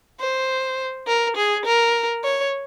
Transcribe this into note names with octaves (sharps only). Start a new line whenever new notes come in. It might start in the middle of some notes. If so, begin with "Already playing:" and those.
C5
A#4
G#4
A#4
C#5